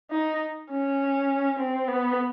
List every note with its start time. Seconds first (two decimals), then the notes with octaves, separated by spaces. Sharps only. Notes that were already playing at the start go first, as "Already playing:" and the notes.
0.11 D#4
0.70 C#4
1.59 C4
1.88 B3